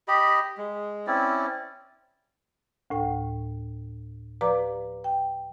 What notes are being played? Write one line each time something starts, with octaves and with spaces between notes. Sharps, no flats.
G4 D#5 B5
G#3
C4 C#4 E4 D5
D2 A2 G5
F3 G4 B4 D5 A#5 D6
G5